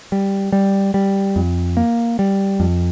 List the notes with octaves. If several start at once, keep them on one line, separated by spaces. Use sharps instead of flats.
G3
G3
G3
F2
A#3
G3
F2